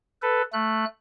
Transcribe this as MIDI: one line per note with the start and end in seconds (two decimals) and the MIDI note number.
0.22 0.42 69
0.22 0.42 71
0.53 0.85 57
0.53 0.85 90